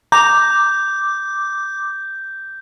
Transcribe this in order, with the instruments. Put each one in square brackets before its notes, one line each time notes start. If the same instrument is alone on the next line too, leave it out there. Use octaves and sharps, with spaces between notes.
[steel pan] A#5 [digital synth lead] D6 [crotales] G6